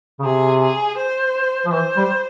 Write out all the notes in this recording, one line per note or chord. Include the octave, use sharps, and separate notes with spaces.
C#3
C3 G#4
G#4
C5
F3
E3 C5
G3